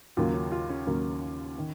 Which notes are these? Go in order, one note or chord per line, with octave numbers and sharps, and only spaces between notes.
D#2 C#3 F#3 A#3 F4
C#4
F4
C#4
D#2 C#3 F#3 A#3
D#3